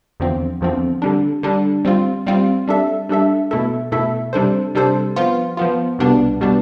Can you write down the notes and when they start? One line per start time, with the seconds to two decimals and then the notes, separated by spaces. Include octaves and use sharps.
0.20 E2 D3 F3 C4
0.61 E2 D3 F3 C4
1.02 D3 G3 D4
1.43 D3 G3 D4
1.85 G3 C4 F4
2.27 G3 C4 F4
2.68 G3 D4 A4 E5
3.09 G3 D4 A4 E5
3.51 B2 A3 E4 A4 E5
3.92 B2 A3 E4 A4 E5
4.33 C3 G3 D4 A4 C5
4.75 C3 G3 D4 A4 C5
5.16 F3 B3 F4
5.57 F3 B3 F4
5.99 C2 B2 G3 B3 D4
6.41 B2 G3 B3 D4